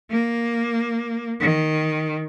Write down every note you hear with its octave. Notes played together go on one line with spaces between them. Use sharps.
A#3
D#3